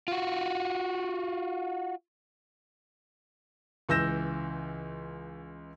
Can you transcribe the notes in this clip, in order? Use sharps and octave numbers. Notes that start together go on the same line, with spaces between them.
F4 F#4
C#2 E3 E6 G6 A#6 E7